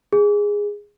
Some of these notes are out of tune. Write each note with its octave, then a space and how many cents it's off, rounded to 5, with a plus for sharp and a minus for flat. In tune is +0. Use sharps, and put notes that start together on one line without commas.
G#4 -10